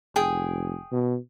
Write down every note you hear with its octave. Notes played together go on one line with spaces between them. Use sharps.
F1 G#4 G5 D#6
B2